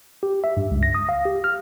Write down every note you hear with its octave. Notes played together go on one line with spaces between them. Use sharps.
G4
E5
G2
C#2
A#6
D#6
F5
G4
F6